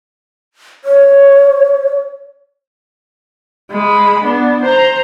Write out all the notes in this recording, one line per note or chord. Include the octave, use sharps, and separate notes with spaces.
C#5
G#3 B5
B3 D4
C5 A#5